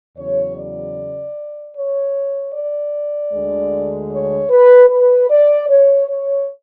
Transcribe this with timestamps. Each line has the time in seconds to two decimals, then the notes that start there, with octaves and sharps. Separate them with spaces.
0.17 E2 C#3 F#3 C#5
0.58 D5
1.75 C#5
2.54 D5
3.33 D2 D3 G#3
4.11 C#5
4.50 B4
4.89 B4
5.29 D5
5.69 C#5
6.08 C#5